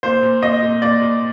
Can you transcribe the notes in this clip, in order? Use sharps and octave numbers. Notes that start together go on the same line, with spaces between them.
A#2 C5
A#2
A#2 D#5
A#2
A#2 D5
A#2